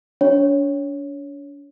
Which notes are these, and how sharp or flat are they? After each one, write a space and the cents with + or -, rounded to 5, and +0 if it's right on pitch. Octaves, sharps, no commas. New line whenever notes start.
D4 -45 C#5 +0